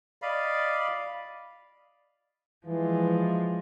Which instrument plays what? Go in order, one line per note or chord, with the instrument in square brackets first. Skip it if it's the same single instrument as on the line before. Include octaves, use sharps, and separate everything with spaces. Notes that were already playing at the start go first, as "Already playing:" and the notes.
[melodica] D5 D#5 F5 B5
[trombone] E3 [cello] F3 G#3